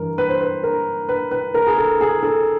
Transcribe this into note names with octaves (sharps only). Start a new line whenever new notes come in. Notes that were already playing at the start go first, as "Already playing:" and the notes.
Already playing: G2 E3 A#4
B4
C5
B4
A#4
B4
B4
A#4
G#4
A4
G#4
A4